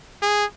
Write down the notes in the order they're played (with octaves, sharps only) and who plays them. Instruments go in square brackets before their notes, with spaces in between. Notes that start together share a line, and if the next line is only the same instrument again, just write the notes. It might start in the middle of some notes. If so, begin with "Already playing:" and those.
[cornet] G#4